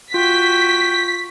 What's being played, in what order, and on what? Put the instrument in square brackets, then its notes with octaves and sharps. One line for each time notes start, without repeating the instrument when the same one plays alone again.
[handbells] F4 [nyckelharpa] F#4 G5 [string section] B6